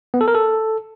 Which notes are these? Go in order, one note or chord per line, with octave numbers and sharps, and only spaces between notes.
B3
A4
A#4
A4